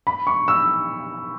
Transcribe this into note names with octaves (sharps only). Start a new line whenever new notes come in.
B5
C#6
E6